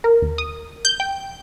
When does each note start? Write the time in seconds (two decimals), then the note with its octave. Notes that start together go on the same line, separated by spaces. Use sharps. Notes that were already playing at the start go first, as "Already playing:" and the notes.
0.04 A#4
0.22 D#2
0.38 D#6
0.85 G6
1.00 G5